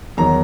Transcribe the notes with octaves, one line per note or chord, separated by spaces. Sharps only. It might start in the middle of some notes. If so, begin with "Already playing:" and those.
E2 D#3 F#3 A#5